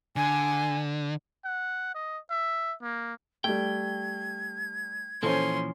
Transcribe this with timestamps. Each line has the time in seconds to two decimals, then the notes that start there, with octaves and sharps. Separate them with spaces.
0.16 D3 G#5
1.45 F#5
1.95 D#5
2.30 E5
2.82 A#3
3.44 G3 A3 G5 G#6
5.23 A#2 E3 F3 C#4 A4 C5 C6